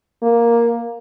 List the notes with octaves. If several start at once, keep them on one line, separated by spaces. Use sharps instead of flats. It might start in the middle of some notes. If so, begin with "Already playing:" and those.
A#3